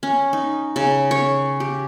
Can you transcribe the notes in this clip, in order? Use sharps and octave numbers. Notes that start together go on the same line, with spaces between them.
C#4
D#4
C#3
C#5
G4